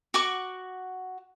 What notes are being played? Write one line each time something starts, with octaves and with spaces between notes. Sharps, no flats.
F#4 F#5 C#6 D6